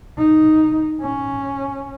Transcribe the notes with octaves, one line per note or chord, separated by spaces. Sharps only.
D#4
C#4